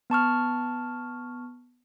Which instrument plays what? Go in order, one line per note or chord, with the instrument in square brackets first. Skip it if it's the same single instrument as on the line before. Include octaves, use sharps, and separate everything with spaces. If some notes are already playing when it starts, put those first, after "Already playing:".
[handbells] B3 A5 C#6 F6